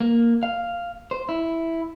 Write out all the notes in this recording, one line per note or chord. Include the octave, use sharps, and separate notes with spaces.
A#3
F5
C5
E4